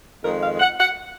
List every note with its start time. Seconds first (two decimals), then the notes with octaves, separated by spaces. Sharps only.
0.23 F2 D#3 G#3 A#4
0.41 F5
0.60 F#5
0.78 F#5